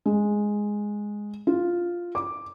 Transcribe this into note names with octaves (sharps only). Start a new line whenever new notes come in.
G#3
F4
D6